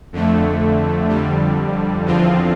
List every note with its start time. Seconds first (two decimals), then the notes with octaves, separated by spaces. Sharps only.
0.13 F2 D3 A3
1.09 F2 D3 G3
2.05 E2 D3 F3 C4 F4